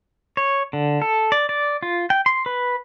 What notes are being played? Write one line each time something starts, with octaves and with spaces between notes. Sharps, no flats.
C#5
D3
A4
D5
D5
F4
G5
C6
B4